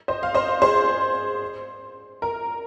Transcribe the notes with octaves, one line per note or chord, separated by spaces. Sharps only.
C5 D#5
F5
C5 D#5
G#4 C5
A#4